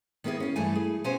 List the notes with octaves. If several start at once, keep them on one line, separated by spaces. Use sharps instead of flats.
D#3 A#3 B3 E4 G#4
A#3 C#4
G2 E3 A3 G#5
G#4
B2 C#4 C5 G#5